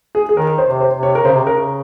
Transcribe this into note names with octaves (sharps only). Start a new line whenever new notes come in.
G#4
G#4
D#3 A#4
C5
C3
C5
C3
C#5
A#4
C#3 C5
C3
C#3 A#4